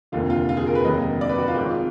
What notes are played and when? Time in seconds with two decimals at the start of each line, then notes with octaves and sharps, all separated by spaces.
0.12 F1 D#2 D3 F3 F4
0.30 F4
0.49 F4
0.57 G#4
0.67 A#4
0.75 B4
0.84 F1 D#2 D3 F#3 D#5
1.21 D5
1.29 B4
1.38 F#4
1.48 F4
1.57 G#1 G#2 F3 G#3